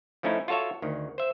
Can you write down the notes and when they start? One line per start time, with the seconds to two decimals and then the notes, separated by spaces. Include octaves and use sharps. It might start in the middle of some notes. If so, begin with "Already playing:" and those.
0.23 F3 A3 C#4 D#4 E4
0.48 F4 F#4 A4 C#5 E5
0.82 D2 D#3
1.18 C5 E5